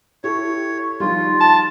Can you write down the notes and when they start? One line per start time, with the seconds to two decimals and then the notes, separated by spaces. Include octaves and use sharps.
0.24 E4 G4 A4 C#5
1.00 D#3 F3 G3 F4
1.41 A5